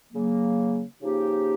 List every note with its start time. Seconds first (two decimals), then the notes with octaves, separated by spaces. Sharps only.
0.13 C#3 F#3 A#3
1.02 C#3 F3 A#3 D#4 G4